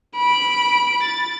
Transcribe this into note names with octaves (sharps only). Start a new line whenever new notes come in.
B5 D7
A6